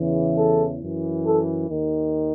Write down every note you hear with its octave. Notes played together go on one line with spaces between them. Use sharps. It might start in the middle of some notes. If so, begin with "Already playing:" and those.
Already playing: E2 C#3 E3
A4
F#2 E3
A4
D#2 D#3